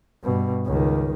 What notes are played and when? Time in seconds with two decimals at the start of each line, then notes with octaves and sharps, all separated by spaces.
0.23 G2 B2
0.66 C#2 D#3